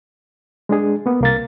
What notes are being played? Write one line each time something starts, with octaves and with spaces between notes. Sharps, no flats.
G#3 D4 G#4
A#3 B3
C2 A#3 A6